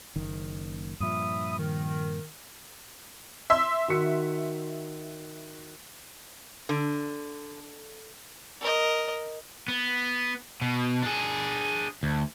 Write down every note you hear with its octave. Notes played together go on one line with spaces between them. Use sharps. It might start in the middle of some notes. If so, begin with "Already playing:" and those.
F#1 D#3
G2 A#2 F3 E5 B5 D#6
D#3
E5 C6 E6
D#3 F#4 C#7
D3
A#4 D#5
B3
B2
D4 G#4
D2